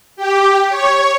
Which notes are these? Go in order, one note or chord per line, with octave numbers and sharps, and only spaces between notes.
G4
C#5